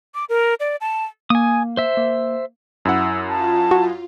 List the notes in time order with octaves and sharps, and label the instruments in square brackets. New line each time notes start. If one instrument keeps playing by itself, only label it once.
[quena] D6
A#4
D5
A5
[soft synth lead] A#3 [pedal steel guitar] G#5 D#6
[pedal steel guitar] C5 E5
[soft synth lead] A#3
[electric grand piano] F#2 E4 F#5 [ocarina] E6
[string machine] F4 [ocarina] A5
[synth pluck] F#4